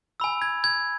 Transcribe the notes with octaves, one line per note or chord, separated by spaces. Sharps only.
G#5 B5 E6
G#6
G#6